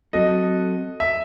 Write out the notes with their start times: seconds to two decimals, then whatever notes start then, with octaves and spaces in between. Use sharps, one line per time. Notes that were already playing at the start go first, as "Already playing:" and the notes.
0.13 F#3 C4 F#4 A4 D#5
1.00 E5